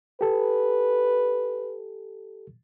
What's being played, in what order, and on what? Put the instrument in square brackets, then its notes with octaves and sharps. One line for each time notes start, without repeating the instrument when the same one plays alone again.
[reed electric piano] G4 A4 [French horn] B4